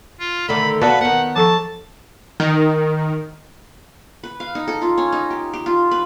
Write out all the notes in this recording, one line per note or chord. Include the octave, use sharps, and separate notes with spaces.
F4
D3 D#3 A3 B5
B3 F#4 B4 D5 F5 A5
D#3 B3 F#5
F3 A4 A5 C#6
D#3
B4
F5
D#4
A4
F4
C#4
D#4
G4
G4
F4
B4